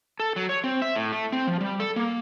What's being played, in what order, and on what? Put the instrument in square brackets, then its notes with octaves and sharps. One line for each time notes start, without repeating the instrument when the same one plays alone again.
[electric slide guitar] A4
F#3
C#5
C4
E5
A2
A3
C4
F3
G3
A4
A#3